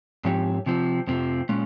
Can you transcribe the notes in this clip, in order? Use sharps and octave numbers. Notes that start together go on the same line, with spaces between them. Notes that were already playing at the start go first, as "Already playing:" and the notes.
G#2 F3 C4 G4 C#5
C3 F3 C4
F2 C3 F3 C4
A#2 G#3 C#4